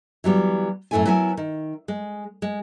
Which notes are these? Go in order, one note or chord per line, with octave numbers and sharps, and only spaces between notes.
E3 F#3 G3 B3
F#2 A2 A3 E4 A4 G#5
F#3 B3 E4 A#4 G#5
D#3
G#3
G#3